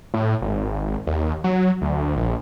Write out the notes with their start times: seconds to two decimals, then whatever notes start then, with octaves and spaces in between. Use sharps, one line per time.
0.14 A2
0.42 G#1
1.07 D#2
1.44 F#3
1.82 D2
2.16 A#1